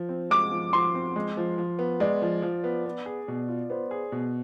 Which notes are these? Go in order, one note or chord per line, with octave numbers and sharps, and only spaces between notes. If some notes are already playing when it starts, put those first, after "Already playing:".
Already playing: F3
C4
G#3 D6
F3
F3 C6
C4
G#3
F3
F3
B3
G#3 D5
F3
F3
B3
B3
G#4
B2
F4
B3 C5
G#4
B2